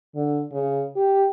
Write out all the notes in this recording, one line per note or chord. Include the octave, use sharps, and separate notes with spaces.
D3
C#3
G4